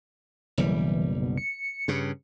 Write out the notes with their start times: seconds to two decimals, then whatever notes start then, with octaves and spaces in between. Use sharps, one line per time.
0.58 F#1 B1 E3 G3
1.21 B2
1.38 C#7
1.88 G2 C#3